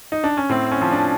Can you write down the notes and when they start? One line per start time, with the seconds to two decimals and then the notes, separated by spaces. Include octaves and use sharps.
0.12 D#4
0.24 D4
0.37 C#4
0.49 A2 C4
0.71 C#4
0.82 F3
0.92 D4